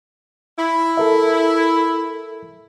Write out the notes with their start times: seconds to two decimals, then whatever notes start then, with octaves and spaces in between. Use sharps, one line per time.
0.58 E4
0.97 A4 A#4 E5